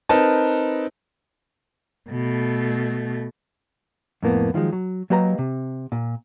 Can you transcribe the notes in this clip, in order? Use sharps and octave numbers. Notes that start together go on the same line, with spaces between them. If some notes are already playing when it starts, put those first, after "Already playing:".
C4 D#4 A#4 B4 A5
B2 A3
F2 A2 A#3 B3
D#3 F3 F#3 G#3
F#3
F#3 A#3 G4 B4 D#5 A#5
C3
A#2